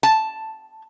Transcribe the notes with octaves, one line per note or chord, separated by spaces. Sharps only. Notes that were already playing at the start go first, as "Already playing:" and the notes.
A5